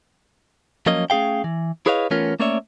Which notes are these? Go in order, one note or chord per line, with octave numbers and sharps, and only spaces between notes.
F3 F#3 A#3 C#4 D#5
A3 C#4 G#4 F5 G5
E3
E4 G#4 B4 C#5 D#5 F5
E3 A3 B3 C#4 F4 A#4
A3 A#3 C#4 C#5 D5 E5